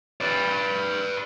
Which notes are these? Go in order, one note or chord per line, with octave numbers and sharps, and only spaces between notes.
B4 D5